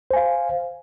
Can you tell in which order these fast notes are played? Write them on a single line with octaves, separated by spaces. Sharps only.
C5 G#5 F5